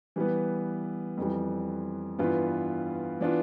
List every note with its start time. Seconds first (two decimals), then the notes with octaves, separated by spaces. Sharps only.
0.16 E3 G3 B3
1.17 F2 E3 G3
2.18 G2 E3 B3 F4
3.21 E3 B3 D4 F4